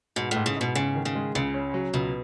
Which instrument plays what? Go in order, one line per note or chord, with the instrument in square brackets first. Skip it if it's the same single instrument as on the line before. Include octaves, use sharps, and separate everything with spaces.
[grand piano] G#2 [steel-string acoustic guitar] B2
[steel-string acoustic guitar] A2
[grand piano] G#2
[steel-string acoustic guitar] C#3
[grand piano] G#2 [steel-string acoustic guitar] B2
[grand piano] G#2 [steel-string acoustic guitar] C#3
[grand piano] D#3
[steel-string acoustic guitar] C#3
[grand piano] G#3
[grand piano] C#2 [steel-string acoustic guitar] C#3
[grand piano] C#4
F#3
[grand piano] C#2 [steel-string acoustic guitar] B2